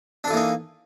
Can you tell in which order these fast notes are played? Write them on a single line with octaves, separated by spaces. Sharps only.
D4 A4 E3 A#3 D#4